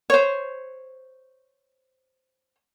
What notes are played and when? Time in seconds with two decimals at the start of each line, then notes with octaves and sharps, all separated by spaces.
0.10 C5 C#5